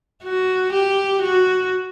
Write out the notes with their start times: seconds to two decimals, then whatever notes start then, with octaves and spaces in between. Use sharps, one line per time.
0.24 F#4
0.73 G4
1.22 F#4